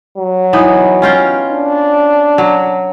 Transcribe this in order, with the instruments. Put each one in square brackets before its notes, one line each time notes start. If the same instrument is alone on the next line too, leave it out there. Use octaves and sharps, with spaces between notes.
[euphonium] F#3
[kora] E3 B3 D#4
C#4 F4 G5
[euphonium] D4
[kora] F#3